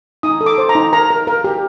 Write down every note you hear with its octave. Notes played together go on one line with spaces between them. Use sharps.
D#4 D#6
A4
D6
C5
A#5
D#4
A#4 A#5
A#4
A#4
G4